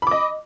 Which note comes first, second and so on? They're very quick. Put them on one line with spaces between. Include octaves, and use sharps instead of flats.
B5 D6 D#5